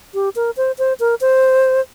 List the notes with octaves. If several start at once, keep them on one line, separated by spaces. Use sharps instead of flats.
G4
A#4
C5
C5
A#4
C5